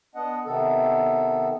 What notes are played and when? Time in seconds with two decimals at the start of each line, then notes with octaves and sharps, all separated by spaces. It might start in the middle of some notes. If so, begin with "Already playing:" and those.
0.15 B3 D4 D#5 F#5
0.46 C3 D#3 B3 A4